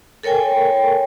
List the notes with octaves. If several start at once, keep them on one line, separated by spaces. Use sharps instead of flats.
A4 A#4 C#5 G5 G#5